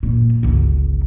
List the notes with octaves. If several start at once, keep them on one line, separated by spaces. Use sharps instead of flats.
F#2 A#2
G1 C#2